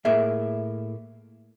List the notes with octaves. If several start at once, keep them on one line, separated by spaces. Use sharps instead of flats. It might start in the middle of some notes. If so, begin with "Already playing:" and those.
A2 A#3 G#4 E5